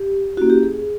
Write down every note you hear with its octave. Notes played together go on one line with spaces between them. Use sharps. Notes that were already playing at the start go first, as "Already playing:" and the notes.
Already playing: G4
A#3 C#4 E4 F#4
G4
G#4